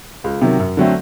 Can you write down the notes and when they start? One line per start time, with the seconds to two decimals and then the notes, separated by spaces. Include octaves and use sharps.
0.24 C#2
0.42 C3 D#3 F#3
0.59 F#2
0.77 D3 F#3 A3 C4